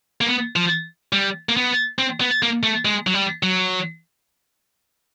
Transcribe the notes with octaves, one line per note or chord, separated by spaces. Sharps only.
A#3
B3
F3
G3
A#3
B3
C4
B3
A#3
A3
G#3
F#3
G3
F#3